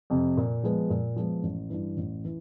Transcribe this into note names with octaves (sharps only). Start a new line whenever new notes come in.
F2 C3
A#2
F3 G#3 B3
A#2
F3 G#3 B3
A1
G2 E3
A1
E3